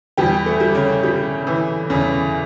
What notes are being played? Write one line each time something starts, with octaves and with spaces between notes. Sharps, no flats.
E2 G3 G4
A3
G3
C#3 C#4
G3
E3
E2 C#3 C#4